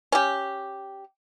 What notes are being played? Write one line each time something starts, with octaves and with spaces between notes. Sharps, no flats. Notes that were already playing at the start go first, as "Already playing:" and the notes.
C#4 G4